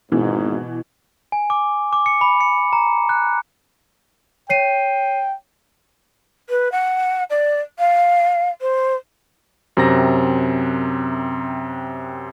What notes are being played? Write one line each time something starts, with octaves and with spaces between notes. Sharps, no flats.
G#1 E2 G#2 B2 E3
G#5
D6
D6
C#7
B5
C#7
A#5
F#6
C#5 G5 C7 D#7
B4
F#5
D5
F5
C5
F#2 C3 C4 A#5 A#6